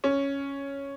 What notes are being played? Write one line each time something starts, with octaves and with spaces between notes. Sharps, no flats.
C#4